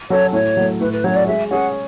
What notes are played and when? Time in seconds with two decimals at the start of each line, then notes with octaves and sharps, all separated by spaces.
0.10 F#3 C#4 F#4 A4 C#5
0.33 A2 C#5
0.57 F#3 A3
0.80 A2 B4
0.92 B4
1.04 F#3 C#4 F#4 C#5
1.15 D5
1.27 G#3 E5
1.50 C#4 G#4 F#5